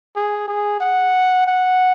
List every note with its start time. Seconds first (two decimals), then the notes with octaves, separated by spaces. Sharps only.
0.16 G#4
0.48 G#4
0.80 F#5
1.47 F#5